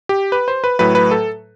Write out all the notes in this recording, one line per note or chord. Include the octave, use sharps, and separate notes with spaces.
G4
B4
C5
B4
A2 F#3 A3 B4
B4
A4